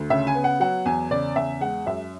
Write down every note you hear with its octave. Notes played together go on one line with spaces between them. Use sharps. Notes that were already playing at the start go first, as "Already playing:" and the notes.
Already playing: D2
C#3 E5
G#5
B3
F#5
F#3 F#5
E2 G#5
C#3 D5
E2 E5
G#3 F#5
F#2 E5